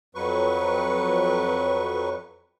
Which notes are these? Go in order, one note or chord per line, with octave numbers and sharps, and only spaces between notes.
F2 F#3 B4 C#6